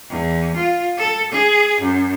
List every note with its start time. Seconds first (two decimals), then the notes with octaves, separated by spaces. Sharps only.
0.10 E2
0.56 F4
0.98 A4
1.32 G#4
1.81 F#2